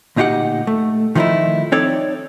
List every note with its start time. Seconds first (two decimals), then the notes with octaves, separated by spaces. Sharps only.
0.16 D2 A#2 D#4 F4 G4 F#5
0.67 A3
1.15 D#3 F3 A3 C#4 D#4 E4
1.72 C4 D#4 A4 C#5 D5